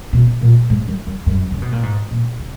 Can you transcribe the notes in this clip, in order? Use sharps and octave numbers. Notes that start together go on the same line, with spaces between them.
B2
A#2
G#2
F#2
F#2
F#2
C#3
B2
A#2
G#2
A#2
C#3